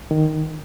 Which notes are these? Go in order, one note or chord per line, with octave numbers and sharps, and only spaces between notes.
D#3